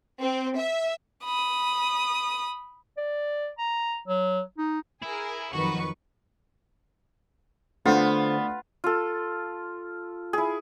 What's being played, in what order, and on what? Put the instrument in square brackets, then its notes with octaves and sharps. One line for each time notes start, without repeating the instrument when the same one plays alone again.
[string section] C4
E5
[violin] B5 D#6
[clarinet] D5
A#5
F#3
D#4
[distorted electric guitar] E4 [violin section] G#4 A#4
[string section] F2 D#3 F#3 [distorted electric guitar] F#4 [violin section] B4 C#6
[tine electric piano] D3 C5 [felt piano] A3 D4 [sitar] B3 [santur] F4
[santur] F4 A4
E4 G#4